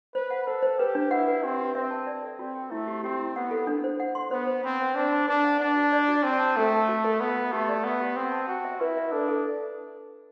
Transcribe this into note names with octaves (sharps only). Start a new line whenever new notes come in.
B4 C5
F#5
A4 C5
C5
G4 B4
D4
E4 F#5
B4
C4 G4
G4
C4 E5
A5
D5
A4
C4 F#4
G5
A3 E4
G4
C4 G4
E4
B3 F#5
A4
D4
C5
F#5
C6
B3 C5
C5
C4 B5
C5
D4 C5
B5
D4 B4
F#5
D4 F#5
F#4
D5
F#4
C4 A5
A5
A3 A4
A5
F#4
A4
B3 B5
B5
A3 G4
D5
B3 F#5
G4
C4 F#5
A5
F#4 G5
E5
E4 B4
E5
D4 A4
A4